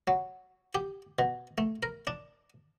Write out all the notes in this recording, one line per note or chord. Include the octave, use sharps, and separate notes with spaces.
F#3
G4
B2
A3
A#4
D4